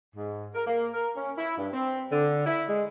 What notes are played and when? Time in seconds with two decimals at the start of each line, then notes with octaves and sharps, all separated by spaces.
0.15 G#2
0.55 A#4
0.67 A#3
0.93 A#4
1.16 C#4
1.37 E4
1.57 G2
1.73 C4
2.12 D3
2.46 E4
2.68 G#3